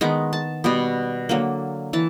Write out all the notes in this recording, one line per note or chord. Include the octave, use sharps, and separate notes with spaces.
D#3 G#3 B3 A#5
A5
B2 G3 B3
D3 F#3 A#3
E3 A5